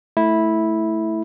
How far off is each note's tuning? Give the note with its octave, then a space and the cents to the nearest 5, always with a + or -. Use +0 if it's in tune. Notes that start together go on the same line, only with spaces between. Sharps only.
A3 +0 E4 -10